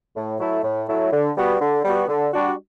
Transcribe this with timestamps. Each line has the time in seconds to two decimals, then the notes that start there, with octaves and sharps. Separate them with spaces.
0.16 A2
0.39 F#3 A3 E4
0.63 A2
0.88 F#3 A3 E4
1.12 D3
1.36 G3 B3 F#4
1.60 D3
1.84 G3 B3 F#4
2.08 D3
2.33 G3 D4 F#4